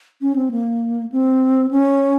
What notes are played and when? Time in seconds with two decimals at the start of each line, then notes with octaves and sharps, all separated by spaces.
0.21 C#4
0.36 C4
0.51 A#3
1.12 C4
1.71 C#4